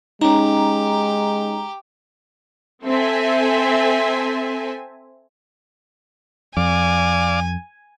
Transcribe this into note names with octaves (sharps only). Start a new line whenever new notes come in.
G#3 C#4 D#4 G4 A#5
C4 A4 E5 G#5
F2 D5 F5 G#5 D6